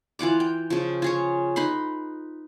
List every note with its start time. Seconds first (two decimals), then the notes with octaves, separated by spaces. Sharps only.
0.19 E3 F4 F#5 D6
0.40 G5
0.70 C#3 F3
1.02 F4 G#4 C#5
1.56 D#4 B4 B5 C6